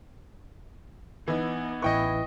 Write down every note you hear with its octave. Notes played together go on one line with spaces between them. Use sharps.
E3 B3 D#4
A1 E4 B4 D#5 G5 C#6